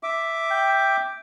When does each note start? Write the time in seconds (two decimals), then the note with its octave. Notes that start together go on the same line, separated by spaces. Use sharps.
0.03 E5 D6
0.51 G5